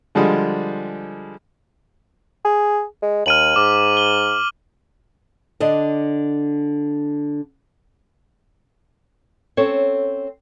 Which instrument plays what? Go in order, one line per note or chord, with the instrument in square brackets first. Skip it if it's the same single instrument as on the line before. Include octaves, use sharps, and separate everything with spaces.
[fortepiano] D3 F3 G3 G#3 G#4
[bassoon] G#4
G#3
[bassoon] D#2 [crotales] F6 D#7 F#7
[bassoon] G#2 [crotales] D6
[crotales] G7
[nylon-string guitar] D3 D4 D#5
C4 C#4 A4 C#5